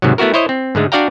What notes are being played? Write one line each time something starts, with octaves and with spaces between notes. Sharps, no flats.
G#2 C3 D#3 F#3
A3 B3 E4 F#4 A#4
E4 C5 C#5 D#5
C4
G#2 D3 G#3 A3
D4 F#4 D5 F5 G5 A#5